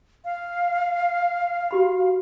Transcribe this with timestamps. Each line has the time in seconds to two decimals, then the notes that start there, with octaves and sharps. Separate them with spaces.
0.25 F5
1.71 F#4 G4 B5